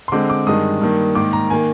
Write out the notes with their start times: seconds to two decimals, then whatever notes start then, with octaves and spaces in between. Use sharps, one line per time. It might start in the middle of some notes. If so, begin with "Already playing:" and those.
0.08 C6
0.12 D3 G#3 C4 D6
0.30 D6
0.47 G2 D#3 G#3 D#6
0.81 G2 D#3 A#3
1.15 G#2 D#3 A#3 D6
1.33 A#5
1.50 D#3 A#3 G#5